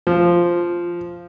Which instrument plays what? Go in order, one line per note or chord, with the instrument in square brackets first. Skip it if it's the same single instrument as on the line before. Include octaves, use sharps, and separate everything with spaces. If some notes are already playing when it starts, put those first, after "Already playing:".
[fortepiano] F3